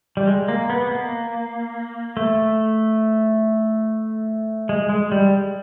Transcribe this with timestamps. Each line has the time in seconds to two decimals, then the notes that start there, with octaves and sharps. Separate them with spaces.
0.17 G3
0.27 G#3
0.49 A#3
0.70 B3
0.91 A#3
2.17 A3
4.69 G#3
4.89 G#3
5.12 G3